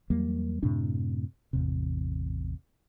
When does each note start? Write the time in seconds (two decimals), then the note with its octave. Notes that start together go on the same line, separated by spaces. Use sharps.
0.10 E2 F#3 G3 A#3
0.63 F#2 A2 C3 D4
1.53 A1 E2 C3